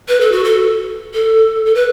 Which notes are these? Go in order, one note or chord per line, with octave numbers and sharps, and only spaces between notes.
B4
A4
F#4
A4
A4
A4
B4